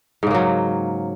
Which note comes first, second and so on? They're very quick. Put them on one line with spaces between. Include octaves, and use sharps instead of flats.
G#2 C#3 A#3 F#3